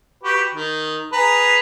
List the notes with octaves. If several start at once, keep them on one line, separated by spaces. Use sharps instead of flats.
F#4 G4 B4
D#3
G#4 B4 A#5